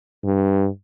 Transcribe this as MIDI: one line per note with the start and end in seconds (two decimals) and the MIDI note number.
0.24 0.67 43